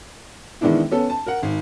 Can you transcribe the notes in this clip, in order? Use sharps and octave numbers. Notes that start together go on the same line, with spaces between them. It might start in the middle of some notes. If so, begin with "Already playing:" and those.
D#3 E3 G#3 B3 D4 E4
B3 C#4 A4
A5
A#4 F#5
G#1